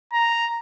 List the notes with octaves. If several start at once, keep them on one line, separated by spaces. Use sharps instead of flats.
A#5